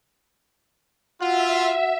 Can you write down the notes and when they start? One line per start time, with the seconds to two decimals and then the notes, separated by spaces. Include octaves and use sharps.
1.21 F4 F#4 E5 F#5